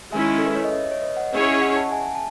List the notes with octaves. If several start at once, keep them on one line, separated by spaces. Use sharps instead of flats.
D#3 G#3 C#4 E4 E5 G#5
A4
B4
C#5
D#5
C#5 E5
C#5
B4 D#5
D#5 F#5
C#4 E4 G#4 C#5
D#5 F#5
F#5 A5
E5 G#5
A5